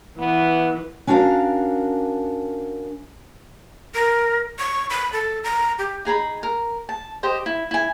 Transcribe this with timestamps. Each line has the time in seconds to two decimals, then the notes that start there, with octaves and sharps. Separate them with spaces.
0.19 E3 B3
1.07 C#4 D4 F#4 A#4 F5
3.94 A#4
4.59 C#6
4.90 B5
5.13 A4
5.44 A#5
5.79 G4
6.05 D#4 G#4 A#5 B5
6.43 A#4
6.89 A5
7.23 G4 C5 D#5
7.46 E4
7.71 E4 G#5